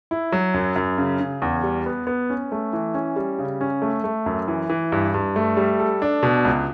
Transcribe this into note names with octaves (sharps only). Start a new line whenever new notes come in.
E4
F#3
F#2
F#2
C#3
C#3
E2
G3
B3
B3
C#4
A3
E3
C#4
G3
C#3
C#4
A3
A3
F#2
E3
E3
G2
G2
A3
G3
A4
D4
B2
C#2